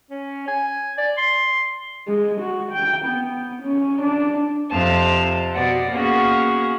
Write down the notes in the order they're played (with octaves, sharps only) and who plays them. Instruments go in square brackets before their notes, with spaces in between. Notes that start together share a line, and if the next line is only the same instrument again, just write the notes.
[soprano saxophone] C#4
G#5
D5
C6
[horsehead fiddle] G#3
F#4
G5
B3
C#4
D4
[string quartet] F2 C3 F5 A5
B2 D5 F#5
A#3 B3 C#4 F#4 G#4